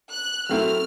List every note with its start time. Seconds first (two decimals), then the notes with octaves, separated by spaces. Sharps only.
0.11 F#6
0.49 F#3 A3 C4 E4 F6